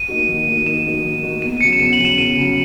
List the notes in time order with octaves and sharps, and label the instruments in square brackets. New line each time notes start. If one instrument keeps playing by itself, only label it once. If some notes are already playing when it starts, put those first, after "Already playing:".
Already playing: [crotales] D#7
[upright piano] A#3 D#4 F#4
D#3
A#3 D#4 F#4
[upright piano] D#3 [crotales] E7
[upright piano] A#3 D#4 F#4
D#3
A#3 D#4 F#4
[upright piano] E2 [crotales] D#7
[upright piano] C#3 F#3 [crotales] C#7
[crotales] E7
[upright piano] E2 [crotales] D#7
[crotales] F#7
[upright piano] C#3 F#3
[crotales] E7
[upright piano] E2 [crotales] D#7
[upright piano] C#3 F#3